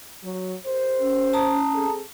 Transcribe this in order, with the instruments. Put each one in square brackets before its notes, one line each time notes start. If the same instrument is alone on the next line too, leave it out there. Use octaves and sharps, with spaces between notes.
[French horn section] F#3
G4 A#4 C5
[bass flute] C#4
[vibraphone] A5 A#5 D#6
[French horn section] C4 G#4 A4